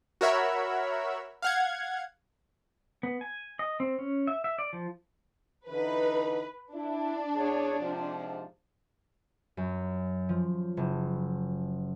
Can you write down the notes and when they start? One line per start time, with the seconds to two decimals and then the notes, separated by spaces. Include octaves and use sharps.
0.21 F#4 A#4 C#5 E5 B5 E6
1.42 F5 F#5 G#6
3.03 B3
3.21 G#5
3.59 D#5
3.80 C4
3.99 C#4
4.27 E5
4.44 E5
4.59 D5
4.73 F3
5.68 D3 E3 D#4 B4
6.74 D4 E4
7.35 E2 G#4 C#5
7.79 G#2 C3 F3
9.57 F#2
10.29 F3
10.77 F#1